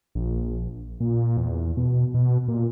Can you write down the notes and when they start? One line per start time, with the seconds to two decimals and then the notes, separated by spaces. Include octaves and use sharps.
0.15 A#1
1.00 A#2
1.37 E2
1.77 B2
2.14 B2
2.48 A#2